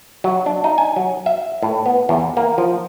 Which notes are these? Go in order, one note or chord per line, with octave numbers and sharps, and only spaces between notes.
F#3
D4
D#4
G#5
F#3
E5
A2
B3
E2
A#3
F3